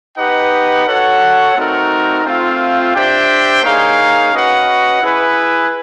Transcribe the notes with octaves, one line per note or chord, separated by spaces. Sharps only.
D#4 G4 B4 D#5 F#5
F#4 A4 C#5 F#5
A3 C4 D#4 F#4 A#4
A3 C4 F4
D4 G4 C5 E5 G5
A#3 D#4 G#4 C#5 F5
C#4 F#4 B4 D#5 F#5
E4 G#4 B4